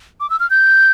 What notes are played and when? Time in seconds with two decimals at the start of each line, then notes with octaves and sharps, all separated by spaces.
0.20 D6
0.30 E6
0.40 F6
0.50 G6